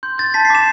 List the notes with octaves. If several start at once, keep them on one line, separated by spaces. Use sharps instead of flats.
C6 G6
G6 A6
A5 B6
C7
D6 G6 E7